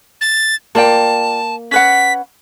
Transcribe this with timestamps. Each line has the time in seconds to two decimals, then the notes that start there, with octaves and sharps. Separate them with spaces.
0.21 A6
0.75 A#3 F4 D5 G5 A5
1.71 C#4 B4 F#5 B6